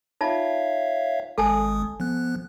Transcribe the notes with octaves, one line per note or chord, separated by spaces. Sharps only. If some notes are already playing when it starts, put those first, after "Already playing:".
D#4 F4 C#5 E5 F5 A5
G#1 G#3 A4 G#5 A5 D#6
F3 B3 F#6